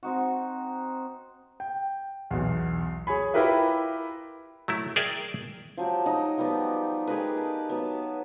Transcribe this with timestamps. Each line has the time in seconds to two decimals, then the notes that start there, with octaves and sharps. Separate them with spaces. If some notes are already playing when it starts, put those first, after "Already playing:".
0.03 C4 D#4 F#4
1.60 G5
2.31 B1 E2
3.07 G#4 C#5 G#5 B5
3.34 E4 F4 G4 A#4 B4 E5
4.68 F#3 A3 E4
4.96 G#4 A#4 D5 E5 G5
5.77 F3 F#3 G4
6.06 D#4 D#5
6.37 F3 G3 B3
7.07 G4 G#4 A#4 B4
7.37 A5
7.70 F#3 B3